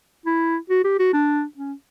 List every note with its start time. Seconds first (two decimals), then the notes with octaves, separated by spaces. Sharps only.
0.26 E4
0.70 F#4
0.84 G4
0.99 F#4
1.13 D4
1.57 C#4